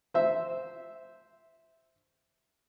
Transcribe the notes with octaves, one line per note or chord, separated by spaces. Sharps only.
C5 E5